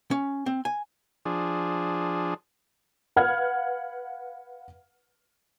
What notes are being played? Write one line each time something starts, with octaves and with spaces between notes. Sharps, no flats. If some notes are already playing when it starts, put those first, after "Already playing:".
C#4
C4
G#5
F3 D4 G#4
B4 F5 F#5 F6 G#6